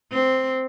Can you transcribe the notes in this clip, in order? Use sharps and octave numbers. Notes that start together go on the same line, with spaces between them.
C4